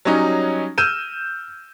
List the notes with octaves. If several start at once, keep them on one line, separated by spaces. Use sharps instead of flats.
F#3 G3 C#4 D#4
E6 F6 G6 D#7 E7